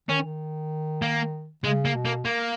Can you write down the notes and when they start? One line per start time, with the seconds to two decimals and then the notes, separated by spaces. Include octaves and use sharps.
0.09 D#3 C#4
0.24 D#3
1.02 A#3
1.64 C#3 G#3
1.85 A#3
1.95 B2
2.05 A#3
2.25 A#3